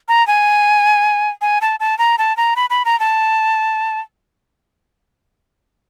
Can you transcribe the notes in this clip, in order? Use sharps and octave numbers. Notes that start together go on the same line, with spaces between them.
A#5
G#5
G#5
A5
A5
A#5
A5
A#5
B5
B5
A#5
A5